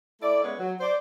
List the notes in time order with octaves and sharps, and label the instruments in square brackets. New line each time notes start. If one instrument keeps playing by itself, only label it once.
[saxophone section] A3 E4 D5
G#3 B3 C#4 B4 C#5
F#3
C5 D5